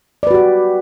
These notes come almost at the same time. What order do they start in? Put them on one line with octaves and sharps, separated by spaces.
D5 B4 F#4 G4